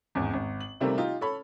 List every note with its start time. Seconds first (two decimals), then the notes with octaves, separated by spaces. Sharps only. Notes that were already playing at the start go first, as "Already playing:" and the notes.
0.15 G#1 E2
0.33 G#1
0.60 F#7
0.81 C3 D#3 G3 A3 A#3 C4
0.98 D#4 F4 G4
1.21 A4 C#5 B5